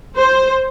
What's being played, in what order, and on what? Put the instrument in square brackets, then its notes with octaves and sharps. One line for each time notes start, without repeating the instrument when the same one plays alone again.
[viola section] C5